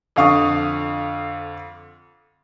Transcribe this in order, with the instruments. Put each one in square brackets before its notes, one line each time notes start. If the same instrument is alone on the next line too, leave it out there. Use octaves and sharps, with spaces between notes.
[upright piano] F2 D3 F5 C#6 D#6